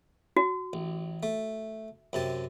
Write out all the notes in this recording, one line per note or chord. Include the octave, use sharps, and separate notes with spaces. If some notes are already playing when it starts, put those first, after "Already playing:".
F#4
A1
A3
F#2 C3 A5